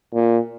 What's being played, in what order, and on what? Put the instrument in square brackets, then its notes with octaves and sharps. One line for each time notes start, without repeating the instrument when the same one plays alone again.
[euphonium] A#2